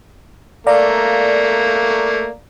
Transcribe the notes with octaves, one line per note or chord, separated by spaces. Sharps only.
A3 A#3 D5 F5 A#5